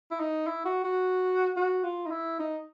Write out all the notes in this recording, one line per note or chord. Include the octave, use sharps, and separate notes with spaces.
E4
D#4
E4
F#4
F#4
F#4
F4
D#4
E4
D#4